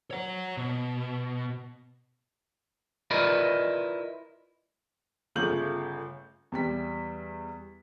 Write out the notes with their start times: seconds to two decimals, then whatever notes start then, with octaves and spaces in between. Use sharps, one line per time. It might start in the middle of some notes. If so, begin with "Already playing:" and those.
0.11 C#5 F#5
0.57 B2
3.11 E4 F4 A#4 B4 D5 D#5
5.36 G1 C#3 A3 F4 G6 F#7
6.52 E2 G3 B6